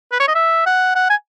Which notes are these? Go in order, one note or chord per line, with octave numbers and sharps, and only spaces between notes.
B4
C#5
D#5
E5
F#5
F#5
G#5